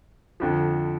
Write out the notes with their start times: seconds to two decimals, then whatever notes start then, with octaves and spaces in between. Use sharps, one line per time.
0.40 F2 D3 F3